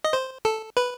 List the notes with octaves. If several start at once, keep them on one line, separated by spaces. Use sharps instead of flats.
D#5
C5
A4
B4